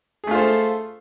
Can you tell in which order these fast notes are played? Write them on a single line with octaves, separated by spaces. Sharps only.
G#4 A3 F4 C5 A4